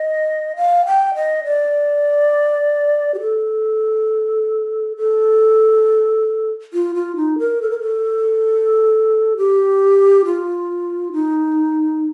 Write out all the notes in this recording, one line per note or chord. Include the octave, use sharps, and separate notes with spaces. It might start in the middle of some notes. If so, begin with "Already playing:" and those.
Already playing: D#5
F5
G5
D#5
D5
G4
A4
A4
F4
F4
D#4
A#4
A4
A#4
A4
G4
F4
D#4